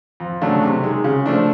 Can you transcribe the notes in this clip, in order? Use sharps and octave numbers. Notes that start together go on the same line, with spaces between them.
F2
C#3 F#3 A3 D4
C3
D#3 G#3
C#3
F3 A3 D4